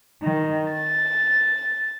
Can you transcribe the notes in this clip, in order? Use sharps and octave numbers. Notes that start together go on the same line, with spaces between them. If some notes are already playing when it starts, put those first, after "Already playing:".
D#3
A6